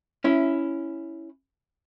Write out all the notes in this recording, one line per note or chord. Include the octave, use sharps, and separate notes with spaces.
C#4 E4